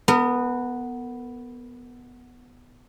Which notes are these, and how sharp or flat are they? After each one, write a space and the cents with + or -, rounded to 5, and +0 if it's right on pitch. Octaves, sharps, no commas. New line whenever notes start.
B3 +0 A#4 -35